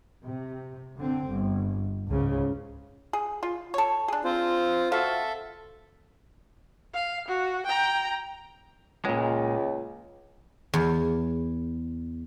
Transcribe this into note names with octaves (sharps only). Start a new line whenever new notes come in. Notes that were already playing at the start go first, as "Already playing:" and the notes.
C3
D3 C4
G1
C#2 G#2 C#3
G#4
F4
A4 C#5
D4 G#4
C4 F4 C5
F#4 A4 E5 F5
F5
F#4
G5 A#5
C#2 A#2 G#3
E2